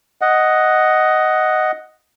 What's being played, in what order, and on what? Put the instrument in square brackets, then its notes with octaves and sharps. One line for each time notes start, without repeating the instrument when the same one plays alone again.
[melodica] D#5 F#5